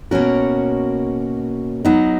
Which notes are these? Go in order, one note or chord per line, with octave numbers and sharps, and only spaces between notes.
B2 A#3 C#4 F#4 A#4
F#3 B3 D#4